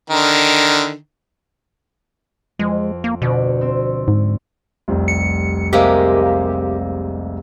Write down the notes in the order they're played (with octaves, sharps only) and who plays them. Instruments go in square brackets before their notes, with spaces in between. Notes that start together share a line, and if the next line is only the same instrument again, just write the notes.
[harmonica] D3 D#3
[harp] F2 [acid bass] G#3
[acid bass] A#3
[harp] D2 D4 A#6 [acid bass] B2
[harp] C4 E6
[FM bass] G#2
[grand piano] F1 C2 C4
[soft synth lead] C#7
[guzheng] C3 G#3 A#3 [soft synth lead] G4